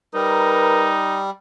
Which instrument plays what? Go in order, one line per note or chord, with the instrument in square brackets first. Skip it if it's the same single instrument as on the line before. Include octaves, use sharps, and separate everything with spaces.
[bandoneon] G3 [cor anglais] D#4 [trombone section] A#4 B4